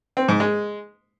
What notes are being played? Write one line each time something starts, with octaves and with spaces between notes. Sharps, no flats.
C4
G#2
G#3